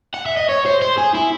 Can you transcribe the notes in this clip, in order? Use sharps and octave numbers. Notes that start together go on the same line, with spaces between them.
F#5
E5
D#5
C#5
C5
C5
G#4
E4